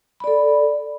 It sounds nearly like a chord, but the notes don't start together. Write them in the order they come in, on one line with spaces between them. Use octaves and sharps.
B5 D5 A4